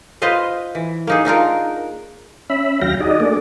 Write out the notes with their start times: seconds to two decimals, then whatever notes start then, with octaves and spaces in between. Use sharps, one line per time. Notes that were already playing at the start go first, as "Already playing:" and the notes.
0.22 F4 B4 C5 D#5 F5
0.75 E3
1.07 A#3 D#4 G#4
1.25 D4 D#4 F4 A#4
2.50 C#4 E5 B5
2.81 D#2 F#3 F5 G5 A#6
3.00 D#4 F#4 G#4 D5 D#5
3.20 A3 A#3 D4 G#4 D5